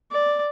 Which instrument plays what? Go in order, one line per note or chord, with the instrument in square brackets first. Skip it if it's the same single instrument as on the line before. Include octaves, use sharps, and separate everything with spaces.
[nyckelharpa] D5